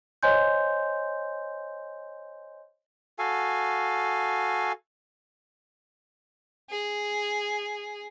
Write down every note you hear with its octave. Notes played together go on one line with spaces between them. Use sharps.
C5 C#5 D#5 G#5 C6 G6
F#4 A4 F5 G#5
G#4